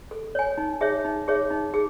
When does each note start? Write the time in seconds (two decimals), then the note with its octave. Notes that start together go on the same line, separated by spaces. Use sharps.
0.11 A4
0.35 C#5 G#5
0.58 D#4
0.81 G#4 C#5 E5
1.05 D#4
1.28 G#4 C#5 E5
1.50 D#4
1.74 G#4